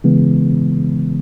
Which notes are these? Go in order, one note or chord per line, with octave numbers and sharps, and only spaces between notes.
C#3 E3 G#3 B3